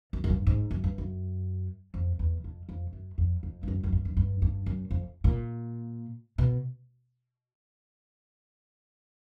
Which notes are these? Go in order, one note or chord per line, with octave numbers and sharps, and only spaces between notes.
F#2
F#2
G2
G#2
F#2
G2
F#2
F2
E2
F2
F2
F#2
F2
F2
G2
F#2
F#2
G2
F#2
G2
G2
F#2
F2
A#2
B2